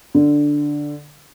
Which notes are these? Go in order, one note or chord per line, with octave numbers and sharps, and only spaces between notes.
D3